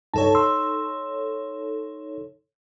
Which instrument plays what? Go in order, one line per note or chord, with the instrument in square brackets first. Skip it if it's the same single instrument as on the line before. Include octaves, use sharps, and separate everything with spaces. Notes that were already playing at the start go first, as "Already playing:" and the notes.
[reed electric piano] C#2 G2 A5 [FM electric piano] D#4 A4 C#5
[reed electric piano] C6 E6